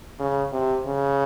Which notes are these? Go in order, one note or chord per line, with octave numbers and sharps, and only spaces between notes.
C#3
C3
C#3